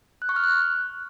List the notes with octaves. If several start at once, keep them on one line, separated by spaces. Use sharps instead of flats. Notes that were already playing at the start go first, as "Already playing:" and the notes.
F#6
C#6
F6
F#6